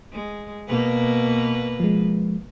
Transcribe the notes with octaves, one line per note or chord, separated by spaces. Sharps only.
G#3
B2 A#3 B4
F3 G#3